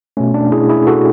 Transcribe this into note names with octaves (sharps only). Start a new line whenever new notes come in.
B2 A3 C#4
D4
E4 G#4
E4 G#4
F#4 A4